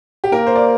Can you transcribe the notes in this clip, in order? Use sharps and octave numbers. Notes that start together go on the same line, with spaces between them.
G4
A#3 A#4
C5
D5